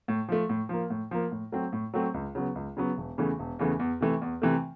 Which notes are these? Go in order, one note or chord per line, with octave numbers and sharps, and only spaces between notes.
A2
F3 A3
A2
F3 A#3
A2
F3 A#3
A2
F#3 A3 C4
A2
F#3 A3 C4
C#2
C#3 F#3 B3
C#2
C#3 F#3 B3
E1
E2 C#3 E3 A3
E1
E2 C#3 E3 A3
E2
C3 E3 A3
E2
C3 E3 A3